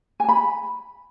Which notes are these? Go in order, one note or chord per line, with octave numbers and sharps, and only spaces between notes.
G#5 A5 B5